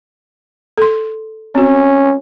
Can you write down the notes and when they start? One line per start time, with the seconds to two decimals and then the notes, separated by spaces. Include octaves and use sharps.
0.78 A4 C6
1.55 C4 C#4 F#4